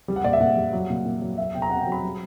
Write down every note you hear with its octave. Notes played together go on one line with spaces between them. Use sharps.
G3
F#5
A#2 D5
E5
A#2 F#5
G3
F#3
A#2
A#2
F#3
F#3 E5
B2 G5
A#5
B2 F#5
G5
F#3
B5
G3